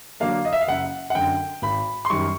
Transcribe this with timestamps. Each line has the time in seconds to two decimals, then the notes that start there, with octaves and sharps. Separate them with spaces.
0.20 D3 F#3 A#3 D4 F5
0.45 D#5
0.53 E5
0.61 F5
0.67 F#1 F#5
1.10 F#5
1.15 F#2 D3 G5
1.62 G#1 B5
2.05 C6
2.10 F#2 D#3 G3 C#6